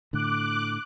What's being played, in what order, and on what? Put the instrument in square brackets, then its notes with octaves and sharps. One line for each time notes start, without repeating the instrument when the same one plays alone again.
[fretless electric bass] A2 D3 [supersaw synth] D6 F#6